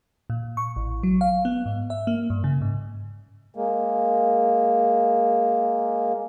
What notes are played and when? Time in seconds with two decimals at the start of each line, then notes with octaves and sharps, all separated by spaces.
0.30 A#2
0.57 C#6
0.76 A1
1.03 F#3
1.21 F5
1.45 B3
1.66 G#2
1.90 E5
2.07 A#3
2.30 G2
2.44 C#3
2.61 G#2
3.55 G#3 A#3